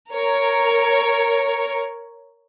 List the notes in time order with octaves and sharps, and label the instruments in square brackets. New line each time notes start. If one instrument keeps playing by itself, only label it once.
[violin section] A#4 C#5